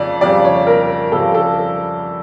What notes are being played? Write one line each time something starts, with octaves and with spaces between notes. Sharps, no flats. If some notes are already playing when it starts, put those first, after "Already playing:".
Already playing: F2 C#3 D5
F2 C#3 G3 D5
C#5
A#4
F2 C#3 G3 A4
A4